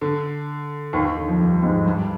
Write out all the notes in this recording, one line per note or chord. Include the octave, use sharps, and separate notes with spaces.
D3
D#2 D#3
D#2 D#3
D3
F2 F3
G2 G3
G#2 G#3
G2 G3